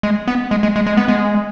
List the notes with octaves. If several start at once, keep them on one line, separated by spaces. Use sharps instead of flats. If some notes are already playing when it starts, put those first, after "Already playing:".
G#3
B3
G#3
G#3
G#3
G#3
B3
G#3